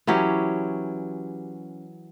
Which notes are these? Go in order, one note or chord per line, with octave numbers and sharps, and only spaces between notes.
E3 F#3 C#4 G4